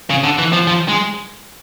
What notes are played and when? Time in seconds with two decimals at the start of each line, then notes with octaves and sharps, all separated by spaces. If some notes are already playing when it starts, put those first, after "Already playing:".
0.10 C#3
0.24 D3
0.38 E3
0.53 F3
0.67 F3
0.89 G#3